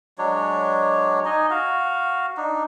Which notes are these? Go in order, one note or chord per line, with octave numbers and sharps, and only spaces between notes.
F#3 G#3 D4 C#5
D#4 D#5 G#5
F#4 F5
D4 D#4